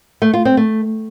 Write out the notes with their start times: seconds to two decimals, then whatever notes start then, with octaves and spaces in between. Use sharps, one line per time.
0.22 A3
0.34 F4
0.45 C4
0.57 A3